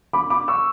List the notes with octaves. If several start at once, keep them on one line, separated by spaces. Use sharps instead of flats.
B5 D6
B5 D6
C#6 E6